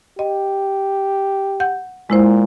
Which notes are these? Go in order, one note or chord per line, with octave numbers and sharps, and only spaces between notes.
G4 D#5
F#5 G6
A#2 G#3 E4 C5